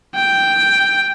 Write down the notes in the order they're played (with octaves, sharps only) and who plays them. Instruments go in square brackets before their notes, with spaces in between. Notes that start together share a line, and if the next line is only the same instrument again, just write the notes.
[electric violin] G5